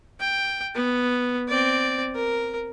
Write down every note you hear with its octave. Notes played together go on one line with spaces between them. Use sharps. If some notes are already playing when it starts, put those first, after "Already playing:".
G5
B3
C4 D5
A#4